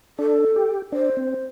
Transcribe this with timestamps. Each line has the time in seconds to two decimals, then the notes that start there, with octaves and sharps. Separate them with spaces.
0.19 D4 A4
0.56 G4
0.92 D4 C5
1.17 C4